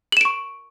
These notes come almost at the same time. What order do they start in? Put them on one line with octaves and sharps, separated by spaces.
F#7 E7 D7 C#6